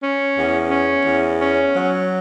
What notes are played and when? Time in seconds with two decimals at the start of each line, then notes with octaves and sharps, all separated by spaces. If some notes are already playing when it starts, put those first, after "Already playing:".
0.02 C#4
0.36 E2
0.71 C#4
1.06 E2
1.41 C#4
1.75 F#3